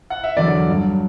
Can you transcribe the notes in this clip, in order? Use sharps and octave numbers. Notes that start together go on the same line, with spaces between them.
F#5
E5
E2 D3 F#3 D5
G2 F#3